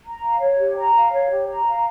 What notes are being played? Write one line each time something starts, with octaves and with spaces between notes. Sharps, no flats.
A#5
F5
C#5
G4
A#5
F5
C#5
G4
A#5
F5